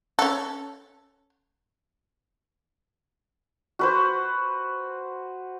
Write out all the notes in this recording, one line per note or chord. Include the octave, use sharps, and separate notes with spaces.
C#4 A4
F#4 B4 C5